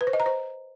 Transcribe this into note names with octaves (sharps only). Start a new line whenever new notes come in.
B4
C5
D#5
A#5
C5